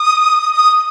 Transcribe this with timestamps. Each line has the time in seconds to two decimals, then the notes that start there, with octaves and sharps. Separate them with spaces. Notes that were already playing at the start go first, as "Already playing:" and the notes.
Already playing: D#6
0.53 D#6